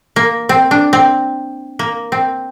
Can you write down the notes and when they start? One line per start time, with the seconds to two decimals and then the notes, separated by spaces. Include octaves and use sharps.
0.16 A#3
0.49 C4
0.71 D4
0.93 C4
1.79 A#3
2.12 C4